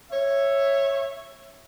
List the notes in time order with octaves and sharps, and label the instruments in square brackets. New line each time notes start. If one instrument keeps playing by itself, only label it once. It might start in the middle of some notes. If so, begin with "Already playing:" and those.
[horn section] C#5 E5